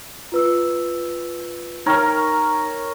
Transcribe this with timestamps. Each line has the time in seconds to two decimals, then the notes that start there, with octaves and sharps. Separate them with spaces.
0.32 F4 B4 E6
1.86 D#4 A#4 C#5 G5 F6